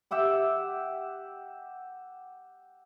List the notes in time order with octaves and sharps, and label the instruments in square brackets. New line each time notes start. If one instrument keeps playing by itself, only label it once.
[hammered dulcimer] G4 E5 F#5 G5